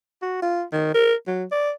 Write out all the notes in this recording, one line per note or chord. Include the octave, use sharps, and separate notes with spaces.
F#4
F4
D#3
A#4
F#3
D5